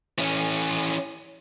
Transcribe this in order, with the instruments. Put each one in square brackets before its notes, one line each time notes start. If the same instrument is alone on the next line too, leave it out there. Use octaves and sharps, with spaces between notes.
[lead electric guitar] E3 C#4